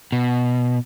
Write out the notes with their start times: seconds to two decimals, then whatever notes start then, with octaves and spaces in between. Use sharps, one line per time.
0.12 B2